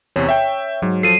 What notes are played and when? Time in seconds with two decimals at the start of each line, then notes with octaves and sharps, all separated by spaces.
0.16 E2 C3 C#5
0.29 E5 G5
0.82 G#2 F#3
1.03 F3 A4 C7 D#7